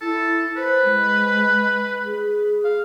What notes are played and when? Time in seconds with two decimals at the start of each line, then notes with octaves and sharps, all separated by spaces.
0.01 E4 A4
0.57 B4 C5
0.85 G#3
2.05 G#4
2.64 F5